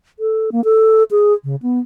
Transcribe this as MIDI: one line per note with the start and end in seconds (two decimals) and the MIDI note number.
0.19 0.50 69
0.52 0.63 58
0.64 1.03 69
1.11 1.33 68
1.44 1.56 49
1.62 1.79 59